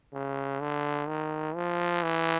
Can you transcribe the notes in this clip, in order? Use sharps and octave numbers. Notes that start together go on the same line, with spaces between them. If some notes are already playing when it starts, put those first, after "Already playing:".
C#3
D3
D#3
F3
E3